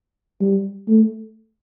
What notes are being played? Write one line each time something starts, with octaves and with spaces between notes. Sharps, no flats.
G3
A3